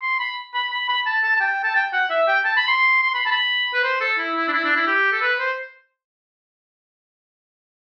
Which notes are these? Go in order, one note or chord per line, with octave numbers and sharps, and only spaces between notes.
C6
B5
B5
B5
B5
A5
A5
A5
G5
A5
G5
F#5
E5
G5
A5
B5
C6
C6
B5
A5
B5
B4
C5
A4
E4
E4
D4
E4
D4
E4
G4
A4
B4
C5